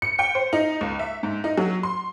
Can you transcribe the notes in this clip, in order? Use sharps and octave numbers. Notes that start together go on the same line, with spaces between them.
C#7
G5
C5
D#4
C#2
E5
G#2
D#4
F#3
C6